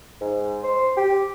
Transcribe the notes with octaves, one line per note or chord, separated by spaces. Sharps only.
G#2
C5
G4